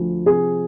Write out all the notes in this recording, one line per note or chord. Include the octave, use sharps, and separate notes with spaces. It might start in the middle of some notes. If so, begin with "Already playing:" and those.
Already playing: D2 F3
C3 G#4